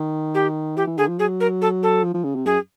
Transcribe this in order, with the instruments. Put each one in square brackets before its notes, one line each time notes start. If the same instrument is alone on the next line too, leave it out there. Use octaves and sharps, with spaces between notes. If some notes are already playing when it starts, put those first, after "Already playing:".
Already playing: [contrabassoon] D#3
[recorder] G4
[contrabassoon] E3 [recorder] G4
[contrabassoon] E3
[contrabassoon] D3 [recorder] G#4
[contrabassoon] F3
[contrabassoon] F#3 [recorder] G#4
[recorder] A#4
A4
A4
[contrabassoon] F3
F3
C#3
C3
[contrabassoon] F#2 [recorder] G#4